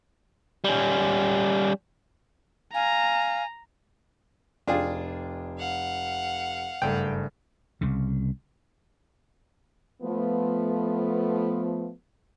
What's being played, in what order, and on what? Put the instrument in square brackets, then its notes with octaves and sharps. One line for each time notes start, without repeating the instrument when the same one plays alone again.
[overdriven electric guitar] G3 C#4
[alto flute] F5 [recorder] G#5 [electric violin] A#5
[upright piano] F1 G5 [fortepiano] D4 F4 G#4
[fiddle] F5 F#5
[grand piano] F#1 G2 A3 [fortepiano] G5
[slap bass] C2 C#3
[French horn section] F3 A3 B3